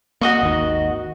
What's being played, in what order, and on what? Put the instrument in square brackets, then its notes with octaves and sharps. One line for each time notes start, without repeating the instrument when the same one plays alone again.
[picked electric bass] A#3 [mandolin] F#4 D#5 C#6
[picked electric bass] G#1 D#2 D#3